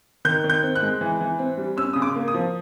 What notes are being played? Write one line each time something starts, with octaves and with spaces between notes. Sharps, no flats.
D#3 G6
D#3
G6
C4
F#6
G#3
E3
E3
C4
G3
C#4 E6
C#3 D#6
D6
A#3
D#6
F3